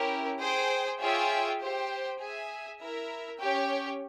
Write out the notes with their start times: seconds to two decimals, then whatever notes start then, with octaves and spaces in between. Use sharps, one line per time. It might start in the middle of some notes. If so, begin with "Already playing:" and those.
Already playing: C#4 E4 G4 A#4
0.39 G#4 C5 G5
1.00 F4 G#4 C#5 E5 G5
1.59 G4 C5 G5
2.19 G#4 E5 G#5
2.80 E4 A#4 E5
3.40 C#4 G4 C#5 G5